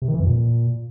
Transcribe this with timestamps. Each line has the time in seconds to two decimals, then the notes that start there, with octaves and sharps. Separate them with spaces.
0.02 C3
0.08 D#3
0.14 E3
0.20 F2
0.26 A#2